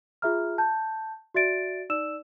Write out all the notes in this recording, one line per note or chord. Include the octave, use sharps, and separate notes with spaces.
F4 G#4 E5 A#5 F6
A5 G6
F#4 D5 E5 A6 D7
D#4 D5 E6 E7